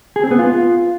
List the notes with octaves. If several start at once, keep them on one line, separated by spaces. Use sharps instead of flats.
G#4
C4
B3
F4